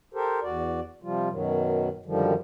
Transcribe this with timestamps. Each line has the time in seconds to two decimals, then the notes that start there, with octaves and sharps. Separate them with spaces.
0.14 G4 A4 A#4 C5
0.42 E2 F#4 D5
1.02 C3 F3 G3 F4
1.30 F#2 B2 D#3 F#3
2.06 F#2 D3 D#3 F3 G3